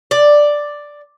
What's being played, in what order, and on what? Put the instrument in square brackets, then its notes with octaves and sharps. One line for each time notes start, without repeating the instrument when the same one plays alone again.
[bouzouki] D5